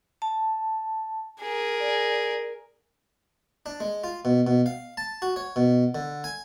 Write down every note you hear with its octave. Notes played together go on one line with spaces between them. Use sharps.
A5
G#4 A#4
D5
D4
G#3
F4
B2
B2
F5
A5
F#4
C#5
B2
D3
G#5